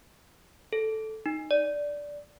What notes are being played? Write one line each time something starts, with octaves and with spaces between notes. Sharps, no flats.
A4
D#4
D5